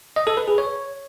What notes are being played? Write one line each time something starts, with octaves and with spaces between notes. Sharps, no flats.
D#5
A4
B4
G#4
C#5